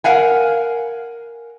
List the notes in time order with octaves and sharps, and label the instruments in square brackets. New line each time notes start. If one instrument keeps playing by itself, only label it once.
[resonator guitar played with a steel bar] A#4 F5 F#5 G#5